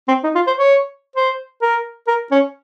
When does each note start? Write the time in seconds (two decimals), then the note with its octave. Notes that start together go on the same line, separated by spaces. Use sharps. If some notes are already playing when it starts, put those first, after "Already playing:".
0.08 C4
0.24 D#4
0.35 F4
0.47 C5
0.58 C#5
1.16 C5
1.62 A#4
2.08 A#4
2.32 C#4